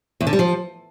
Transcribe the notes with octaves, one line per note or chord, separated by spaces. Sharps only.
E2
D3
G3
F3